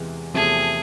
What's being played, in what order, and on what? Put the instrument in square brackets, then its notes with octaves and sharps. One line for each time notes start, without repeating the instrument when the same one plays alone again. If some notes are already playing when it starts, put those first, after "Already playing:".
Already playing: [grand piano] E2 C3 E3 G#3
[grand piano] E2 C3 F3 A3 [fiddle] G#4